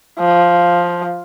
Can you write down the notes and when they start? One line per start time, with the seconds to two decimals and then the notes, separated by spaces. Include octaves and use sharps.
0.19 F3